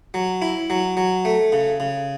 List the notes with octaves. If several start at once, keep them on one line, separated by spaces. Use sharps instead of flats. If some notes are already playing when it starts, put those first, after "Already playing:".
F#3
E4
F#3
F#3
A3
C#3
C#3